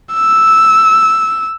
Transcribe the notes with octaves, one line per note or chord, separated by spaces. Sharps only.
E6